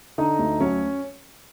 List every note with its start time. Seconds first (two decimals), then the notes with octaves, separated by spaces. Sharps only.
0.18 D3 D#4 D#5
0.39 D2
0.61 F#3 C#4 C#5